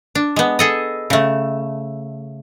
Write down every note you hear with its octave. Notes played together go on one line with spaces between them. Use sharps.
D4
G#3 B3
G#4 A4 D#5
C#3 A3